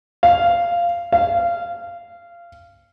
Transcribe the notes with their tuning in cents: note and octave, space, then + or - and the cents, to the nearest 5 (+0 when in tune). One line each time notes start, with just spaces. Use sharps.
F5 -10
F5 -20